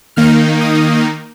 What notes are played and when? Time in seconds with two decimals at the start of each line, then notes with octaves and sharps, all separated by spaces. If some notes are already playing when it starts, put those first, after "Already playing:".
0.16 D#3 A#3 D#4 F6
0.61 D#6